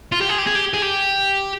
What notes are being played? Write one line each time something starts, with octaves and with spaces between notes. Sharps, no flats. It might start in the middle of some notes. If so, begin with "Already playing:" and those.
F4
G4
G#4
G4
G#4
G4
G#4
G4